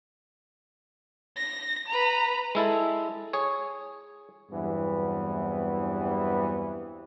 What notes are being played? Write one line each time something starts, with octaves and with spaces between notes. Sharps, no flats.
A#6
B4 A#5
G#3 E4 A4
G#4 C#5
E2 G2 E3 F#3 B3 C4